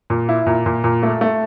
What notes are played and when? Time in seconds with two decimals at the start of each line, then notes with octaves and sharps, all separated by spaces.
0.10 A#2
0.29 E4
0.47 A#2
0.66 A#2
0.84 A#2
1.03 A3
1.21 A3